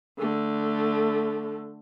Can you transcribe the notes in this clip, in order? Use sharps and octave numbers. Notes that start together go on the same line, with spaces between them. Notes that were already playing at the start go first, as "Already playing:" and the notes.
D3 A3